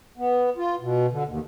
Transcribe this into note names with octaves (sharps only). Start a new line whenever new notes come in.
B3
F4
B2
D3
D#2